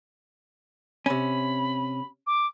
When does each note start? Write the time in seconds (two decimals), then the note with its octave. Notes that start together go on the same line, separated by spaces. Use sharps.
1.06 C3 C#4 B5
2.27 D6